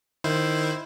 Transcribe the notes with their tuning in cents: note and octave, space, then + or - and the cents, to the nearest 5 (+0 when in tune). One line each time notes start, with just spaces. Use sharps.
D#3 -10 E4 +0 C5 +0